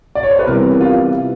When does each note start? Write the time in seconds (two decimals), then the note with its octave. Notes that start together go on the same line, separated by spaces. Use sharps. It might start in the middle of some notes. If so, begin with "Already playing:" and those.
0.15 D5
0.23 C#5
0.31 C5
0.39 B4
0.47 C3 E3 G3 B3 A#4
0.81 F4